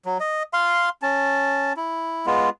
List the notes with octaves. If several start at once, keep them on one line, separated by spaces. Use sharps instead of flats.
F#3
D#5
F5 C6
C#4 A5
E4
G#3 B3 F4